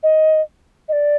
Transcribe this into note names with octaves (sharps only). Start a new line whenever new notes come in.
D#5
D#5
D5